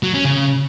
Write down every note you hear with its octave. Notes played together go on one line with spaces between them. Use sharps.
F#3
C#4
C#3